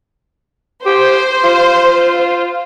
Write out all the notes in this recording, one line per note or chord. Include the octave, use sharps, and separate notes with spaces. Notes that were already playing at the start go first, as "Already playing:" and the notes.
G4 C5
F4